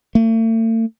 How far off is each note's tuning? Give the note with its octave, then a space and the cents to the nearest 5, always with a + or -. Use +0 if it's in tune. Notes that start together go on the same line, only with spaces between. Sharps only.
A3 +40